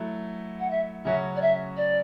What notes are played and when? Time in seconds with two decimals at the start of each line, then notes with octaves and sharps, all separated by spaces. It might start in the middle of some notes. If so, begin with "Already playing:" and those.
Already playing: F#3 A3 E4
0.60 F#5
0.71 E5
1.05 C#3 F#3 C#4 F#4 E5
1.36 D5
1.42 E5
1.77 D5